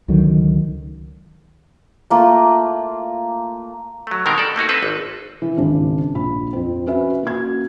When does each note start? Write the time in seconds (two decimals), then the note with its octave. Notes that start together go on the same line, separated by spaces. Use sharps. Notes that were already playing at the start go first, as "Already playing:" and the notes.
0.08 C#2 D3 D#3 F#3
2.10 A3 A#3 F4
4.07 F#3 A3
4.26 B2 D#3 G#3 C4 G4 A#4
4.38 A4 D5
4.56 A3 A#3 D#4 F#4
4.69 C4 A4 B4
4.83 G#1
5.42 E3
5.57 G#1 C#2 D4 C5
6.15 A#1 B5
6.53 F2 C4
6.87 C#4 F#4 B4 E5
7.23 A#3 C#4 F#4 G#6